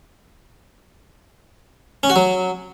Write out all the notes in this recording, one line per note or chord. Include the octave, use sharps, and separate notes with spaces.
C#4
F#4
F#3